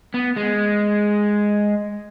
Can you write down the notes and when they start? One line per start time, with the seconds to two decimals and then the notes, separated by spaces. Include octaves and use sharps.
0.14 B3
0.36 G#3